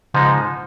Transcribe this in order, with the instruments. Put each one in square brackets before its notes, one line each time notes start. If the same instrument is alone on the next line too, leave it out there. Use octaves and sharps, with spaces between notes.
[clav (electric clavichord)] G#2 F3 G#3 D#4 [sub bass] C#3